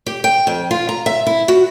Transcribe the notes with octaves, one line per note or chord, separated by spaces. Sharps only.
G4
G5
F2
F4
A#5
E5
E4
F#4